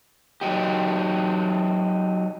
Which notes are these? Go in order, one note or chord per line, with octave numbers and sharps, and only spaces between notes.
F#3 D#4 G4